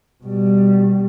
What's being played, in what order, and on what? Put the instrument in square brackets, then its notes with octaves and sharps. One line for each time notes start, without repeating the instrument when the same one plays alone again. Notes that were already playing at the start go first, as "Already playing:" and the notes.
[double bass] B2 G3